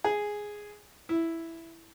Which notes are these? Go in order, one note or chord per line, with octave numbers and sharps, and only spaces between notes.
G#4
E4